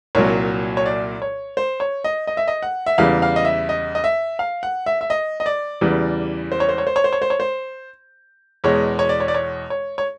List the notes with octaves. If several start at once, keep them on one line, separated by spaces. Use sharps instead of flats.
C2 A#2 F#3 C#5
C#5
D5
C#5
C5
C#5
D#5
D#5
E5
D#5
F#5
E5
E2 C#3 E3 G3 F5
F5
D#5
E5
D#5
D#5
E5
F5
F#5
E5
E5
D#5
D#5
D5
E2 C#3 E3 G3
C5
C#5
C5
C#5
C5
C#5
C5
C#5
C5
C#5
C5
E2 B2 G#3 C#5
C#5
D5
C#5
D5
C#5
C#5
C#5